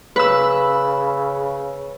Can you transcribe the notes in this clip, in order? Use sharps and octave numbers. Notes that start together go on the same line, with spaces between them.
C#3 B4 E6